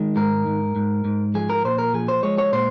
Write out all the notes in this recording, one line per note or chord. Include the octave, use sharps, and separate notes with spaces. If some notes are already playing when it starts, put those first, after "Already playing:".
Already playing: D#3 G#3
G#2 A#4
G#2
G#2
G#2
F3 G#4
A#4
A#2 C5
A#4
F3 G#4
C5
G#3 C#5
C#5
A#2 C5